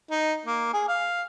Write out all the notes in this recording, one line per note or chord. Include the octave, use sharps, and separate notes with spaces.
D#4
A#3
G#4
F5